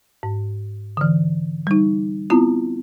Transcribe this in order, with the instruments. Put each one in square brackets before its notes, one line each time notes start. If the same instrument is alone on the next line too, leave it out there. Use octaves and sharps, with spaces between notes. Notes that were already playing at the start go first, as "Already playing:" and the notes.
[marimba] G#2
D3 E3
G3 D#4
B3 C4 E4 F4